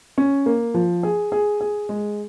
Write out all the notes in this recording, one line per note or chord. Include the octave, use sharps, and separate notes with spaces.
C#4
A#3
F3
G#4
G#4
G#4
G#3